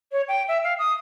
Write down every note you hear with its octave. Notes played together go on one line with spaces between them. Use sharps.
C#5
G5
E5
F5
D#6